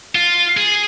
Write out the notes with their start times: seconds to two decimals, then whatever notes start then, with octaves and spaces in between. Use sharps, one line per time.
0.15 F4
0.57 G#4